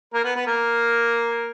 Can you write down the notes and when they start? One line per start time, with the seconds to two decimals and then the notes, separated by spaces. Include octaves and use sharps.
0.14 A#3 A#4
0.24 B3 B4
0.36 B3 B4
0.47 A#3 A#4